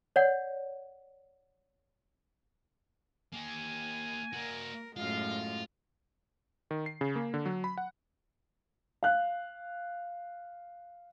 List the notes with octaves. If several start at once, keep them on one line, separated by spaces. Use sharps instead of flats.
C#5 D5 F#5
A#3 G4 G#5
A#3 F#4 A#4
F#2 A2 G#3 F4 F5
D#3
C7
C#3
A#3
D3
F#3
B5
F#5
F5 F#6